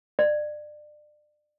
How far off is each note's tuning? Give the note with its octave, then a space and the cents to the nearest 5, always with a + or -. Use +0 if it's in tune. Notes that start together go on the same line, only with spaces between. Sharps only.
D5 +30